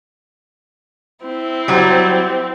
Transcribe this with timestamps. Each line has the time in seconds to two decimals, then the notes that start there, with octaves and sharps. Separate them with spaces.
1.25 C4 E4
1.68 F#3 G3